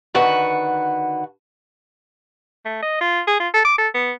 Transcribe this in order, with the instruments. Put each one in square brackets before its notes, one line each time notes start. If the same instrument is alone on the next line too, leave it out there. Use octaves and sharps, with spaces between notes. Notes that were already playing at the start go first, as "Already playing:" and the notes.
[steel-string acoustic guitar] D3 D#3 F#4 B4 F#5
[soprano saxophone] A3
D#5
F4
G#4
F4
A4
D6
A4
B3